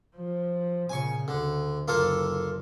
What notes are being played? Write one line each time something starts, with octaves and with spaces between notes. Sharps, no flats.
F3
A#2 C#3 G#5 C#6
D2 D3
F#1 A#3 F4 A4